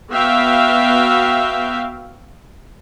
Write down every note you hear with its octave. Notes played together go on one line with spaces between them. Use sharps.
B3 F#4 E5 F5 G5